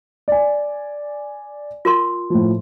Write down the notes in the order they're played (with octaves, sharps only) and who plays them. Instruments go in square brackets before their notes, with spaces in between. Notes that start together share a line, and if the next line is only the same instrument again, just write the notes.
[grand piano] D5 G#5
[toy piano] F4 A#4 C6
[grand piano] A2 F3